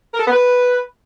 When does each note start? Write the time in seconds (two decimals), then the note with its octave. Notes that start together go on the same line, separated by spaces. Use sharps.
0.14 A#4
0.20 A4
0.26 B3
0.32 B4